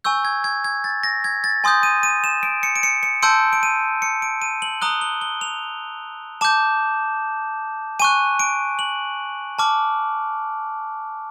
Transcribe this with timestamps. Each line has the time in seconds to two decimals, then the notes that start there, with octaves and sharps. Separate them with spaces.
0.04 G#5 C#6 E6 G6
0.25 G#6
0.44 G#6
0.64 G#6
0.84 A6
1.03 A#6
1.24 G#6
1.44 A6
1.64 G#5 C6 D#6 G6
1.83 D#7
2.03 D#7
2.24 E7
2.43 D7
2.63 C#7
2.76 D7
2.83 C#7
3.03 C#7
3.22 A5 C6 E6 G6 D7
3.53 D7
3.63 D#7
4.02 C#7
4.22 D7
4.42 D#7
4.62 F#7
4.82 A#5 D#6 F#6 G7
5.01 G7
5.21 G7
5.41 F7
6.41 A5 D6 G6 E7
8.00 G#5 C#6 F#6 D#7
8.39 D7
8.79 F#7
9.59 A5 D6 F6